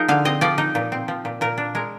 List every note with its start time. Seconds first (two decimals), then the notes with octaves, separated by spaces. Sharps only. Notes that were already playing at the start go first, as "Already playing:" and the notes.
Already playing: F3 D#4 G#4 A#4
0.08 D3 F5
0.25 C4 D#5
0.41 F3 D5
0.58 D#4
0.75 A#2
0.92 C4
1.08 F3
1.25 A#2
1.41 A#2 A#4
1.58 D4
1.75 G#3 A#4